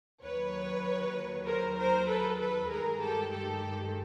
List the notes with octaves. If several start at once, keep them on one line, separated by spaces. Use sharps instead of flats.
D#2 D#3 F#3 B4 C#5
A#4 C5
A#4 C5
A4 B4
A4 B4
G2 D#3 G#3 G#4 A#4
G4 A4
G4 A4